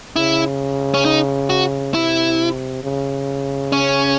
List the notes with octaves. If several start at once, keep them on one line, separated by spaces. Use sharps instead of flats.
C#3 E4
C#4
D#4
F#4
C3 E4
C#3
C#4